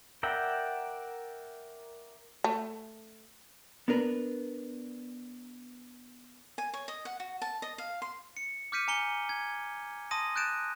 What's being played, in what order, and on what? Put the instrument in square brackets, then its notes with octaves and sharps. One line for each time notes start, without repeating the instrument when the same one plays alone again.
[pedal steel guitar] A#4 D5 E5 F#5 G5
[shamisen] A3
[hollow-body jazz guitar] B3 D4 A#4 B4
[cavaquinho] G#5
C#5
D#5
F#5
F#4
A5
D#5
F5
C6
[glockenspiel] C#7
D6 F6 G6 B6 C#7 D#7
G#5 A#5 C#7 G7
G#6
A5 C6 D#6 A#6 D#7
F#6 G6 A6 D7 E7